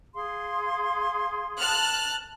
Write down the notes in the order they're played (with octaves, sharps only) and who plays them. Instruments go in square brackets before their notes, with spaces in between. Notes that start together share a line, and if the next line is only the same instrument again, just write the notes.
[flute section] G#4 F5 C6
[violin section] A5 F6 F#6